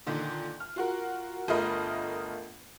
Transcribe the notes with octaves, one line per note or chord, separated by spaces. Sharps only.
A#2 D3 D#3
F6
F4 F#4 A#4
G1 A3 F4 A#4 D#5 B5